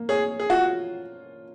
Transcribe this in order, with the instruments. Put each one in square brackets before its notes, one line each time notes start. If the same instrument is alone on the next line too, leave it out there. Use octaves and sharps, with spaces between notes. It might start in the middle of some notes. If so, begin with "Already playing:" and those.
Already playing: [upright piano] A#3
[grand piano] G#4 [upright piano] C#5
[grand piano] G#4
[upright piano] F4 [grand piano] F#4